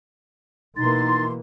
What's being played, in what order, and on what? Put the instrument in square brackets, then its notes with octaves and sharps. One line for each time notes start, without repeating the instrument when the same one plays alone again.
[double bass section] B2 E3 A#3 [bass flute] D#4 [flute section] C6 [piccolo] A6